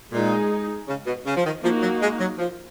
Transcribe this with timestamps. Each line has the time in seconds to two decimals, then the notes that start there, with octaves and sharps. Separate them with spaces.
0.12 A#2 G#3 D#4 G#4
0.88 C#3
1.06 B2
1.26 C#3
1.36 F3
1.45 D#3
1.63 F3 A#3 D#4 F#4
1.82 F#3
2.01 G#3
2.20 F#3
2.38 F3